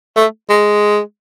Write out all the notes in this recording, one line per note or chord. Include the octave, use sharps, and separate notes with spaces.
A3
G#3